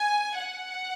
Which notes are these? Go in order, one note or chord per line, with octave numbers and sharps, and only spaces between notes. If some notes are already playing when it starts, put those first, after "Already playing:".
Already playing: G#5
F#5